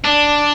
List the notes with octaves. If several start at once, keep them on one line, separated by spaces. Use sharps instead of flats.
D4